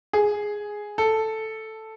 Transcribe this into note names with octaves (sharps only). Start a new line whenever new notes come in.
G#4
A4